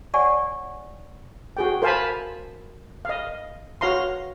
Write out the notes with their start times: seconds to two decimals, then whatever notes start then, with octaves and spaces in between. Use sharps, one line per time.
0.14 C#5 D5 F#5 G#5 C#6
1.57 F#4 G#4 G5
1.82 A#4 C5 F5 G#5 A5 B5
3.05 D#5 F5
3.81 F#4 C#5 F5 A#5 C6